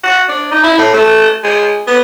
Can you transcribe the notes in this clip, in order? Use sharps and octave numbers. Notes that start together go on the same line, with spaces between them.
F#4
D4
D#4
E4
A2
A3
G#3
B3